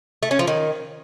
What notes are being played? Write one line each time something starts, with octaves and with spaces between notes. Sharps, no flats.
A3
C#4
F3
D#3